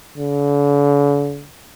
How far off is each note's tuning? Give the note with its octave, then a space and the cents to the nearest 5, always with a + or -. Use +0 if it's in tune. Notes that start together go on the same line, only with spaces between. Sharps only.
D3 -45